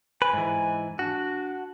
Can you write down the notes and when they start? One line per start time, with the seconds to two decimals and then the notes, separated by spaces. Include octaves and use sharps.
0.22 B4 G#5
0.33 G#2 E3
0.99 D4 F#4